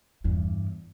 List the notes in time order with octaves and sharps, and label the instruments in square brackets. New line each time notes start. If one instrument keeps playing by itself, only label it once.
[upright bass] E2 G2